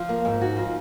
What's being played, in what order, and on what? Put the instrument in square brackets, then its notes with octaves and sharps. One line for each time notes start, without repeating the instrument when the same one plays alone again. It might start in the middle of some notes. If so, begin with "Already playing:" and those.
Already playing: [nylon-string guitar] F3 [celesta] F4
[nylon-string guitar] A#3
G#2
[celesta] D#4 [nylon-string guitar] F#4
[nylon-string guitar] F3 [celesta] F4